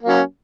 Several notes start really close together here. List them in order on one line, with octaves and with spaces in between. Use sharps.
A#3 F#3 C#4